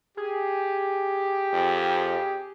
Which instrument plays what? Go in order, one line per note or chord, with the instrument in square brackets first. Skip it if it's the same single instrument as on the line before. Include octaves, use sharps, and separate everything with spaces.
[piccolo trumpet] G4 [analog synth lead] G#4
[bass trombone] F2